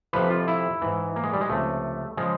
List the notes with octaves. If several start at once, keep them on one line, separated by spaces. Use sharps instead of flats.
F2 C3 F3 B4
F4
E4
G#2 E3
A#3
G#3
G3
G#3
C#2 C3 F3 A3
C#3 F3 G#3